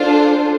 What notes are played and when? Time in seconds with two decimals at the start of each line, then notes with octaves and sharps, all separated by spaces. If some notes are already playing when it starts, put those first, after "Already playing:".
Already playing: D4 F4 A4 C5